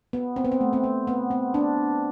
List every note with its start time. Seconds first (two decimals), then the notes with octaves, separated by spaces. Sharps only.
0.13 B3
0.36 C4
0.45 B3
0.52 C4
0.61 A3
0.73 C4
0.84 B3
1.07 B3
1.31 C4
1.54 D4